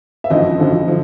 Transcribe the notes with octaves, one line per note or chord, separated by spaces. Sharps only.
E5
G#1 F#2 D3 F3 D#5
G#1 F#2 D3 F3
D3 F3